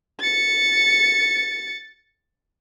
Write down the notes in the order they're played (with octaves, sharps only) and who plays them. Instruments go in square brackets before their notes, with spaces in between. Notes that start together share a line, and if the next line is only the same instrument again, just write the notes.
[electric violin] A6 C#7